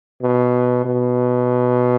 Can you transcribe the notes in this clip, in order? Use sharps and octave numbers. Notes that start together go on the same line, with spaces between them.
B2
B2